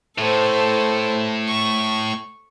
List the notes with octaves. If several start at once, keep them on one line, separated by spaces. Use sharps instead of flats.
A2 A4 C5
C#6